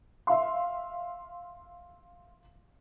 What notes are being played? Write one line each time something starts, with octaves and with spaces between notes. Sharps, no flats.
E5 F5 C6